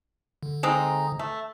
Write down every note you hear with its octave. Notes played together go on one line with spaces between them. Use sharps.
D3
G#3 C4 D#4
A3